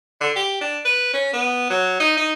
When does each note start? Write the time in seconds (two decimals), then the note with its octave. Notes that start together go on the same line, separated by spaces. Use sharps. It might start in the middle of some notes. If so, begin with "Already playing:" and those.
0.21 D3
0.36 G4
0.61 D4
0.85 B4
1.13 C#4
1.33 B3
1.70 F#3
2.00 D#4
2.17 D#4